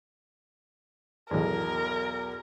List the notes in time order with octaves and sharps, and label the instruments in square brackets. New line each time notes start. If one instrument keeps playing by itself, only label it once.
[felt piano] B1 E2 [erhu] A#4